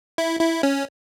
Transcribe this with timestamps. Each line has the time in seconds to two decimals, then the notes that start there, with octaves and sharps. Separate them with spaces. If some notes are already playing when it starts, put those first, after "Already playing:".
0.18 E4
0.40 E4
0.63 C#4